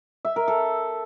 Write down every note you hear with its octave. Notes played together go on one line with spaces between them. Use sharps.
E5
A#4
A4